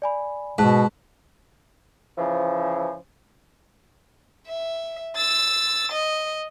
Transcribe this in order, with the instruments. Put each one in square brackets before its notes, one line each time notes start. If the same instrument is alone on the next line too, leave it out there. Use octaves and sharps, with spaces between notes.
[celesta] D5 G#5 B5
[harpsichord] G#2 [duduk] B2 [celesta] A5 F#6 B6
[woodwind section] C#3 E3 F3
[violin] E5
E6 A6
D#5